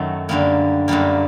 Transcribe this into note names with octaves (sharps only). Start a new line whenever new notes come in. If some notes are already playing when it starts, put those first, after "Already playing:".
Already playing: F#2 D#3 F#3 A3
F#2 D3 G3 A#3
F#2 D3 G3 A#3